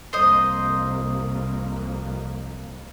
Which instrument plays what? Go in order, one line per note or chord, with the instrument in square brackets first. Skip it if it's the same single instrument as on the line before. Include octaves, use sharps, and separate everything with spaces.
[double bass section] C2 F2 A#3 [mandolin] C5 D#5